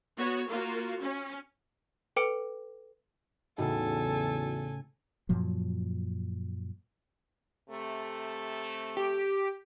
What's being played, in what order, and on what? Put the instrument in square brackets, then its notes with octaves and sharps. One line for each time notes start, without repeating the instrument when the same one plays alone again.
[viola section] B3 F#4 C#5
A#3 F4 F#4
C#4
[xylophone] A4 B4 G5 D6 C#7 D7
[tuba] E2 [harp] A2 C#3 [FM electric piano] D#4 F#4 [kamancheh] A4 G#5
[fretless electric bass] F#2 A#2 F3 F#3
[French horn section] C3 A3
[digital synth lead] G4